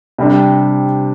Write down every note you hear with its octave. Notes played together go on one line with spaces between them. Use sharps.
C3 G3 D4